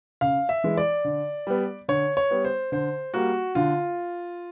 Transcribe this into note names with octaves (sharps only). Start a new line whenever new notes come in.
C#3 F5
E5
E3 G#3
D5
D3
G3 B3
D3 C#5
C#5
G3 B3
C5
D3 C5
G3 A#3 F#4
D3 F4